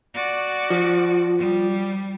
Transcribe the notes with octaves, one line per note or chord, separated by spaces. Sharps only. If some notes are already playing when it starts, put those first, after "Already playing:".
F#4 D5
F3
G3